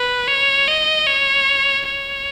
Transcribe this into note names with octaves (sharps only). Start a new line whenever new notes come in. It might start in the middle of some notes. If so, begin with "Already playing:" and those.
Already playing: B4
C#5
D#5
C#5
C#5